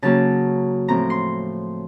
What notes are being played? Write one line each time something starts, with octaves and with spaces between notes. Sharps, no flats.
C#3 F#3 A#3 C#4 A5
A2 F3 C4 A#5
C6